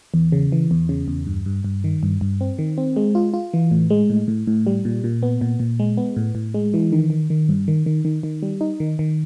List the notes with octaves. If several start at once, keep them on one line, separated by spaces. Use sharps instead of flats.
E2
C#3
E3
E2
C#3
E2
G2
G2
G2
D#3
G2
G2
C4
D#3
C4
G#3
F4
F4
E3
A2
G#3
A2
A2
A2
G3
A#2
A#2
B3
A#2
A#2
G#3
B3
A2
A2
G#3
E3
D#3
D#3
D#3
G2
D#3
D#3
D#3
D#3
G3
D#4
D#3
D#3